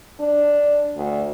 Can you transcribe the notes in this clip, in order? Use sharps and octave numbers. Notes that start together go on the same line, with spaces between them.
D4
D2